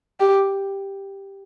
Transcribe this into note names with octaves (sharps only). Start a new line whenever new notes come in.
G4